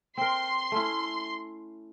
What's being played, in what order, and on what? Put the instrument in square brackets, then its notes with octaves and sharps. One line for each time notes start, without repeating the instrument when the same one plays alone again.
[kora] C4 A#4 [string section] C6
[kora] A3 C#4 E4